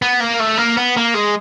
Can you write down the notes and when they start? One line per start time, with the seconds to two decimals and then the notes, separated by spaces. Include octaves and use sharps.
0.02 B3
0.20 A#3
0.40 A3
0.58 A#3
0.77 B3
0.96 A#3
1.14 G#3